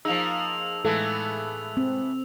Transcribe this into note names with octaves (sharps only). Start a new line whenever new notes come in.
F3 A#3 D#4 G#4 E6 F7
A2 E3 G#3 A3 B3 G#4 A4
C4